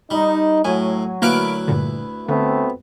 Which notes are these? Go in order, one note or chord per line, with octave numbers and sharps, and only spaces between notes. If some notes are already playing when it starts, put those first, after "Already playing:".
G3 D#4
A2 F#3 G#5
D2 A#3 E4 B4 F6 D7
G2 A#2 D3
D3 A3 B3 C4